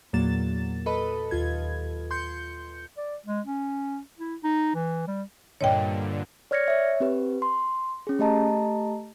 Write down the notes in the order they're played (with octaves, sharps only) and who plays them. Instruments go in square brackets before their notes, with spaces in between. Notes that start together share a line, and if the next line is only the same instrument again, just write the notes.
[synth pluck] E2 A#2 F#3 A#3 A6 E7
A4 B4 D#5 B5
D#2 F4 G#6
C6 G6 C#7
[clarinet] D5
G#3
C#4
E4
D#4
E3
G3
[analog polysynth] G2 A#2 D3 [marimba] C#5 D#5 G5
[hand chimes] C#5 D5 F6 G#6 A#6 C#7
C#5 E5
C4 G4 B4
C6
C#4 G#4
A3 G4 D#5 A5 A#5